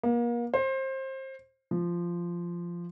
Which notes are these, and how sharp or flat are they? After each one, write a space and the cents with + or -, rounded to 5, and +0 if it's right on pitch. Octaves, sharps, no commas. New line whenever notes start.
A#3 +35
C5 +25
F3 -10